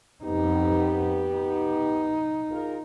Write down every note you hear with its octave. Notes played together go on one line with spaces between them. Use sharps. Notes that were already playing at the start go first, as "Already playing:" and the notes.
F2 B3 D#4 G4
D#4
F4 G#4 A#4